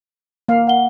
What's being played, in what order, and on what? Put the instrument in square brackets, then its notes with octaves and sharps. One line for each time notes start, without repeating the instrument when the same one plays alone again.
[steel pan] A#3 F5
[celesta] F#5 G7